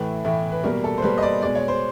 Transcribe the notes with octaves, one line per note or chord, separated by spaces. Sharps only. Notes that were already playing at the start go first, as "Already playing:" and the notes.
Already playing: A2 E3 A3 B4
A2 E3 A3
B4
B2 G3 A#3 A#4
A4
C5
B2 G3 A#3 B4
D#5
D5
B2 G#3 D5
C#5
C5